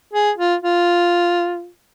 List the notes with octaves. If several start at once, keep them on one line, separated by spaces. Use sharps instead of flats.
G#4
F4
F4